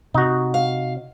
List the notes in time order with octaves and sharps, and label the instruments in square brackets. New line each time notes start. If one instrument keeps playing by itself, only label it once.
[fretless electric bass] C3 [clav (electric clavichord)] D#4 F#4
[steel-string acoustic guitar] F5